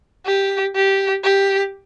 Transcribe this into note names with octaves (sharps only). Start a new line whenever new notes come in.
G4
G4
G4